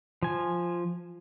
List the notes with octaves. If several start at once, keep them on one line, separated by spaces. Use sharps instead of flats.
F3 G#5